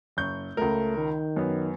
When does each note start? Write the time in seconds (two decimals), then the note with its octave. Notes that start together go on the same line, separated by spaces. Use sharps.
0.17 F#1 C#6 G6
0.57 C#2 A3 A#4
0.97 D#3
1.37 F#2 B3